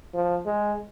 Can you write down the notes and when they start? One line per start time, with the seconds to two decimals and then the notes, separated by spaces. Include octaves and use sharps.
0.14 F3
0.46 G#3